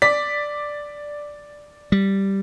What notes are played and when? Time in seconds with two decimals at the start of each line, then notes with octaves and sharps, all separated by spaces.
0.02 D5 B6
1.92 G3